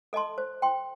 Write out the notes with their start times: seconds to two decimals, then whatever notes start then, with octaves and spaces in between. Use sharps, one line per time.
0.13 A4 D#5 A5 C6
0.38 C5
0.62 G5 C6